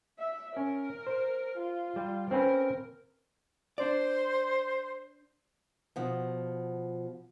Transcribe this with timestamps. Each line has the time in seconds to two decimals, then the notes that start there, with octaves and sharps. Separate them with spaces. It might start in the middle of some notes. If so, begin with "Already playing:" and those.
0.19 E5
0.57 C#4 A#4
1.07 C5
1.58 F4
1.96 G3
2.31 C4 C#4 A#4 B4
3.78 D4 C5 D5
5.96 B2 F3